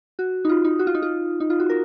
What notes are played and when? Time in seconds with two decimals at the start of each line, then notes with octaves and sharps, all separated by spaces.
0.19 F#4
0.45 D#4
0.49 F4
0.64 D#4
0.79 F#4
0.87 F4
0.95 D#4
1.02 F4
1.40 D#4
1.50 F4
1.60 F#4
1.70 A#4